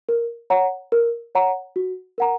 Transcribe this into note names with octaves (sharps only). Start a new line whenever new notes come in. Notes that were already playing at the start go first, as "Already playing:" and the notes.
A#4
C#5 F#5 A#5
A#4
C#5 F#5 A#5
F#4
A#4 F#5 A#5